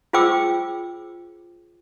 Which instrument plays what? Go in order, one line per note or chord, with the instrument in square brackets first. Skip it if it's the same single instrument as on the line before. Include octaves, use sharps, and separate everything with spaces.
[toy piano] F4 G#4 C5 G5 D6 E6